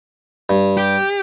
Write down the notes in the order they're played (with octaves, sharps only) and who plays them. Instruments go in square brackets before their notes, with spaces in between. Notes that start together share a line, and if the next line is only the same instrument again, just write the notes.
[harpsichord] G2
[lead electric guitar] G4